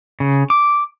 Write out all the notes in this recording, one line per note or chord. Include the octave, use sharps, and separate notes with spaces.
C#3
D6